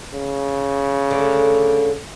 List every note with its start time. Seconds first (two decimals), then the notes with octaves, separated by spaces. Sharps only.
0.14 C#3
1.10 D3 A3